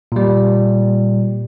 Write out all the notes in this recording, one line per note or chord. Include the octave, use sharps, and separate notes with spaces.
A#2 G3